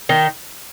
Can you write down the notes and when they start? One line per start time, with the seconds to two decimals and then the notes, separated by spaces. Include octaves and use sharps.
0.09 D#3 D#4